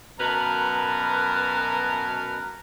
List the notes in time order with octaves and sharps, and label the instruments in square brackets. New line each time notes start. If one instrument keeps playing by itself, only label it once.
[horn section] F#2 B2 A#4 B4 A5